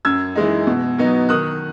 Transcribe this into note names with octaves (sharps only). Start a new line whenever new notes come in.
F#2 E6 G#6
E3 G#3 D#4
B2
F#3 B3 D#4
D#3 D#6 F#6